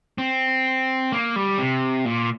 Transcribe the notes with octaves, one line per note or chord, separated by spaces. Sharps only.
C4
A#3
G3
C3
A#2